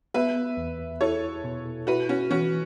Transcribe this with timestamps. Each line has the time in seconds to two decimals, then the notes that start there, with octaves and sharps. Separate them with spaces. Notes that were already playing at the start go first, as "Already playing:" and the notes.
0.14 B3 B4 E5
0.57 E2
1.01 E4 A4 C#5
1.44 B2
1.87 E4 F#4 B4
2.09 C#4 F#4
2.30 E3 C#4 F#4